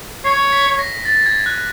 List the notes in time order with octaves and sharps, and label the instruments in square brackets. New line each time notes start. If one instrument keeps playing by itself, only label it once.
[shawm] C#5 [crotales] C7
[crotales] B6
A#6
A6
G#6
F#6